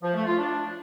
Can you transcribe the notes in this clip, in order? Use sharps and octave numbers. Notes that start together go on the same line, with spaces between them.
F3
A3
F4
D4